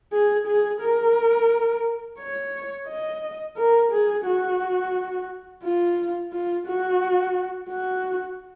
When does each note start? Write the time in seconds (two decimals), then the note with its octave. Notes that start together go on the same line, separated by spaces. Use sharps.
0.12 G#4
0.47 G#4
0.81 A#4
2.19 C#5
2.87 D#5
3.57 A#4
3.91 G#4
4.25 F#4
5.63 F4
6.32 F4
6.67 F#4
7.70 F#4